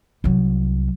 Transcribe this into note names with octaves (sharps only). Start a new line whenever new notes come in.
C2 F#3